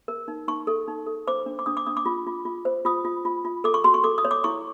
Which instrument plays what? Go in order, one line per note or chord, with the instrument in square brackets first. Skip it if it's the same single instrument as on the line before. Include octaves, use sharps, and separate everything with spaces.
[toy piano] A#4
D#4
D#4 C#6
A4
D#4
A4
C5 D6
D4
D6
D4 D#6
D6
D4 D#6
D6
F4
F4
F4
C5
F4 D#6
F4
F4
F4
A4 D6
C#6
F#4 C6
C#6
A4 D6
D#6
C#5
D6
E4 C#6